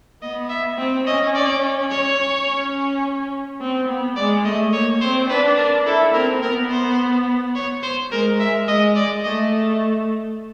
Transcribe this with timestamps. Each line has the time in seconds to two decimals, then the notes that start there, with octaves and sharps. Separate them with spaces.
0.22 B3 D#5
0.50 E5
0.78 C4
1.07 C#4 D#5
1.35 D5
1.91 C#5
2.47 C#4
3.61 C4
3.88 B3
4.16 G#3 D5
4.45 A3 D#5
4.73 A#3 C#5
5.01 C4 C5
5.30 D4 B4
5.58 A#4
5.86 E4 A4
6.14 C4 A#4
6.42 B3 A#4
6.70 C5
7.55 C#5
7.83 C5
8.11 G#3 A#4
8.40 E5
8.68 G#3 D#5
8.96 D5
9.24 A3 D#5